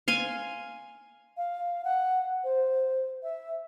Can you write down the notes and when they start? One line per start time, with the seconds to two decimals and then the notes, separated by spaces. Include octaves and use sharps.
0.08 F5 G#5 C6
1.37 F5
1.84 F#5
2.44 C5
3.23 E5